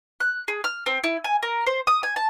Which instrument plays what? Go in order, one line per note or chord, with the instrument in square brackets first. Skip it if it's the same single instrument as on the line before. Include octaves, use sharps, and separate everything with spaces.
[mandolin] F#6
G#4
F6
C4
E4
G#5
A#4
C5
D#6
G#5
A5